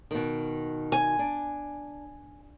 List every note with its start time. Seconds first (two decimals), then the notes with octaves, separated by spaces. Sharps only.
0.11 B2 D#3
0.92 G#5
1.19 D4